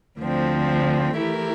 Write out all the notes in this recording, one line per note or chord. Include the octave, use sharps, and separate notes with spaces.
D2 D3 F3 C4
E3 A3 E4 G4 A#4